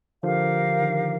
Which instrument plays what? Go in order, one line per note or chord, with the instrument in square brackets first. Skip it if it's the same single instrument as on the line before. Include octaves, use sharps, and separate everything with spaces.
[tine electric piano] D3 F3 [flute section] G4 A#4 F5
[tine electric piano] D#3